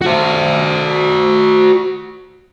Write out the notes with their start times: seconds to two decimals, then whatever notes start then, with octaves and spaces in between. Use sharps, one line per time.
0.01 F#4 C5